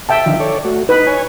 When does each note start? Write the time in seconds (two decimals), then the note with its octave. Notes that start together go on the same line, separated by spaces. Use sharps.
0.09 E5 G5 A5
0.26 D3 D#3 F3
0.40 A4 C#5 D5
0.65 A3 F#4
0.89 D#4 B4
1.07 C#5 G#5